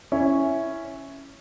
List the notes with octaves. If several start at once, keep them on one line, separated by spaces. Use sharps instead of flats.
C#4 E4